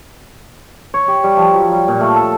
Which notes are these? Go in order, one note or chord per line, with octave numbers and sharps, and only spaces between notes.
C#5
G4
G3
F3
F#3
G3
A#2
A3
A4